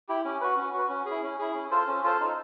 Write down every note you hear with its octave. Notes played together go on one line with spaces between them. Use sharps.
E4 G4
C#4
F#4 B4
C#4
F#4 B4
C#4
G#4
E4
C#4
E4 G#4
C#4
F4 A4 C5
C#4
F4 A4 C5
D#4